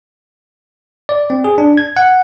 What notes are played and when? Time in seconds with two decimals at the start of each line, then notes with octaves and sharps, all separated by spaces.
1.09 D5
1.30 C4
1.44 G#4
1.58 D4
1.77 G#6
1.97 F#5